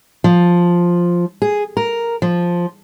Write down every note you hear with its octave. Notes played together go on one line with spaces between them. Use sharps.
F3
G#4
A#4
F3